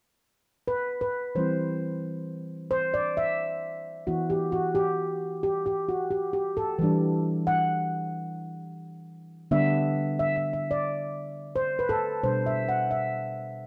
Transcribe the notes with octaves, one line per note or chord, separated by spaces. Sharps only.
B4
B4
E3 G3 C4 E4 C5
C5
D5
E5
E3 B3 E4 F#4
G4
F#4
G4
G4
G4
F#4
G4
G4
A4
E3 G3 D4
F#5
D3 G3 B3 D4 E5
E5
E5
E5
D5
C5
B4
A4
B2 G3 D4 C5
E5
F#5
E5